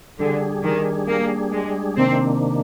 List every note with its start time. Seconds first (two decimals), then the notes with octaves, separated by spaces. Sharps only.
0.19 D3 G3 D4 G#4
0.64 D#3
1.08 A#3
1.52 G#3
1.97 C3 D#3 A#3 C4 D4